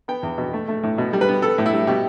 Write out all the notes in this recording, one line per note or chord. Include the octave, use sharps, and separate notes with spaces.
B3 G5
E2
B2
A3
A3
A2
B2
G3
B4
B3
B3 A4
A2
E4
G3
B2 G4